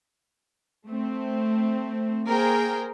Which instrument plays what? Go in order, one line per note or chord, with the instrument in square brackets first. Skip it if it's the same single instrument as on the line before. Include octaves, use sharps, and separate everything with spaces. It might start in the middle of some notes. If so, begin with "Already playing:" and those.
[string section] A3 C4
A#3 G#4 A#4 C5 G5